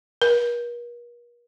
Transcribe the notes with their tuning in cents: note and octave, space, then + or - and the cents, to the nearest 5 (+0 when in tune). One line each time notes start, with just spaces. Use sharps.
A#4 +45